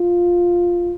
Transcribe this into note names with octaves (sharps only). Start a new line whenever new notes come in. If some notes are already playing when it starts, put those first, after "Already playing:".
Already playing: F4